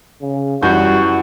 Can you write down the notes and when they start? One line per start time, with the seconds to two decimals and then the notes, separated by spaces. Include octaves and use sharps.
0.22 C#3
0.63 F#2 E3 G3 F#4 G6